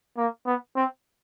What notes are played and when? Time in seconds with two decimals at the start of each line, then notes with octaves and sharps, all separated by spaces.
0.18 A#3
0.46 B3
0.76 C4